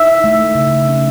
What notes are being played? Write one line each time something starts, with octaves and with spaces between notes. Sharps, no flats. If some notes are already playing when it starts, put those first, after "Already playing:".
Already playing: D#4 E5
A3
C#3
C#4